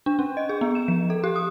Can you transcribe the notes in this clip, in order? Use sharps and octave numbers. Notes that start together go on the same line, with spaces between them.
D4
C#4
D#5
G#4
B3
E7
F3
A4
G4
D#6